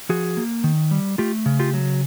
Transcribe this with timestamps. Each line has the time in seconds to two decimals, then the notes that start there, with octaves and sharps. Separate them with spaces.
0.09 F3 F#4 G#4
0.37 A#3
0.64 D#3
0.91 G3
1.18 A3 F4 G4
1.46 C#3
1.59 F4 G4
1.74 F#3